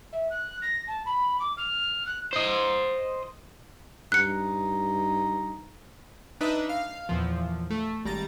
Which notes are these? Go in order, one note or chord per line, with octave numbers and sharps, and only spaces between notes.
E5
F#6
A#6
A5
B5
D6
F6
F#6
C5 D#5
G2 D#4 F#6 C#7
D4 D#4 B4 D#5 E5
F5
E2 A#2 F3
A3
G#1 G3 A#5 A6